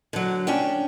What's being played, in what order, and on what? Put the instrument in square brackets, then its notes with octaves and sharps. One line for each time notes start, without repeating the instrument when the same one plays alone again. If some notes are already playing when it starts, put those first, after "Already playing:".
[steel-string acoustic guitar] D3 F#3
C#4 D4 G5